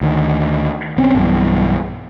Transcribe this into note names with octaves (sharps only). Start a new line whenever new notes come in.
D2 D#3
B1 C4 C#4
B1 G2 B2 E3